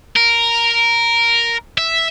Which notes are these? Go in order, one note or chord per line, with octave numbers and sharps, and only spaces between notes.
A#4
E5